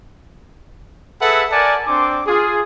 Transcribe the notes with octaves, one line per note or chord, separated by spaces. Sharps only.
G#4 A4 B4 E5 F#5
A#4 D5 F#5 G#5 A5
C4 D4 C6 D6
F4 G#4